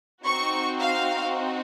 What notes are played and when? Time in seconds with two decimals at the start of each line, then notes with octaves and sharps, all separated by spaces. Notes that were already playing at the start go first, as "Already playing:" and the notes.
0.24 C4 D#4 F#4 C#6
0.80 F5